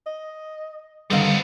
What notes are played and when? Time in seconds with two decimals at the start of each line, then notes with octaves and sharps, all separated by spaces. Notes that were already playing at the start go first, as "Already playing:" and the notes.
0.07 D#5
1.10 G2 D3 D#3 G3 B3 C4 A4 F5